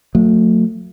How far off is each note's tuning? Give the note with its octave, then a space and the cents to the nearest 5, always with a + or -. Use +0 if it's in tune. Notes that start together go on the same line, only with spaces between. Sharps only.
F#3 -30 A3 +25